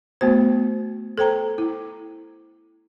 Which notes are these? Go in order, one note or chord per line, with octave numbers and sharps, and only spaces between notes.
A3 B3 F#4 C5
A4 C5 G5 A#5
E4